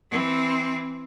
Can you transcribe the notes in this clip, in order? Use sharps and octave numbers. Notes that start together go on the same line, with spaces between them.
E3 C4